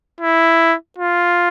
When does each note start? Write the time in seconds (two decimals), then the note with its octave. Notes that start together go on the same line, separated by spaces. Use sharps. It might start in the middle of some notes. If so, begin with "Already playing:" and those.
0.21 E4
0.98 F4